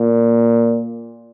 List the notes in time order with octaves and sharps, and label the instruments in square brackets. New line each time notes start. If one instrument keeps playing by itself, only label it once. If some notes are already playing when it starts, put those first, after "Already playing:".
Already playing: [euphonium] A#2